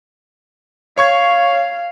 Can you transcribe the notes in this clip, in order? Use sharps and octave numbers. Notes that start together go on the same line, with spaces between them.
C#5 F5 C#6 G#6